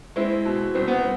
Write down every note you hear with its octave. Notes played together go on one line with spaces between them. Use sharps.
G#3 C4 E4
B2
C2 C4
B3
C4